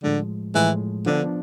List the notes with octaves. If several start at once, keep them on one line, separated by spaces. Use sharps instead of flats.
A2 D3 F3 G#3
A2 E3 F3 G#3
D3 F3 B3 D4